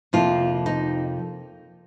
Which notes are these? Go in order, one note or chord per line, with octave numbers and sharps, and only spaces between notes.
F2 C3 F3 A#3 F4
D#4